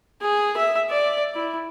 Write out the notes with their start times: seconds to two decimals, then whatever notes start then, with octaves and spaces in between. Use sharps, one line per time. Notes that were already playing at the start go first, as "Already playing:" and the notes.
0.21 G#4
0.57 E5
0.90 D5
1.35 E4